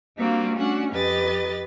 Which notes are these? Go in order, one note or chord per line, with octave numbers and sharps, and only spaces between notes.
G3 A#3 C4 D4 F4 F#4
A3 C#4 D4 F#4 F#5
F2 G4 B4 D#5 A6